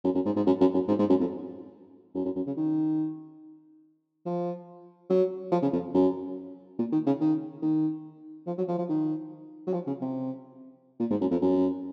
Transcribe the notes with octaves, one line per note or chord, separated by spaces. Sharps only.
F#2
F#2
G#2
G#2
F#2
F#2
F#2
G#2
G#2
F#2
F2
F#2
F#2
F#2
C#3
D#3
F3
F#3
F3
C#3
F2
F#2
A#2
D#3
C#3
D#3
D#3
F3
F#3
F3
F3
D#3
F#3
F3
C#3
C3
A#2
G#2
F#2
F2
F#2